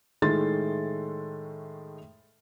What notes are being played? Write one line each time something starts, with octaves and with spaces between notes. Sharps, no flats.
A2 D#3 G#3 A3 C6 A6